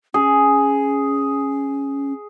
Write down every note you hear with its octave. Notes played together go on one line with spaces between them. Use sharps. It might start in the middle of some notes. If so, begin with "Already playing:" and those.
C#4 G#4